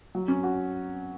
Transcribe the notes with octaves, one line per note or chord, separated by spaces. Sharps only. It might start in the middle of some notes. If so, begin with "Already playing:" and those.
F#3
C#4
F#4